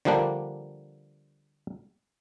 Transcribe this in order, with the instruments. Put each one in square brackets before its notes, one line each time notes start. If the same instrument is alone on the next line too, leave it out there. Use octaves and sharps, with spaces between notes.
[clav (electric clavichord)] D3 F3 G3 A#3 D4